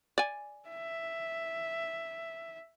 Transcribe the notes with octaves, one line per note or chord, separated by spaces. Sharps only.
D5 G#5
E5